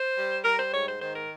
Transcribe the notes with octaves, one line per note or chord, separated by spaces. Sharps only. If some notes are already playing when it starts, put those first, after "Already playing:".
Already playing: C5
G3
G3 A#4
C5
G#2 C#5
C5
D#3 C5
A#4